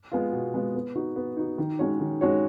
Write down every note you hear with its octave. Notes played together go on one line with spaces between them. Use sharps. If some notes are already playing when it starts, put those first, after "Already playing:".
G#3 B3 F4
B2
G#3 B3 F4
B3
D#4 F#4
B3
D#4 F#4
D#3
G#3 C#4 F#4 C#5
D#3
G#3 C#4 F#4 C#5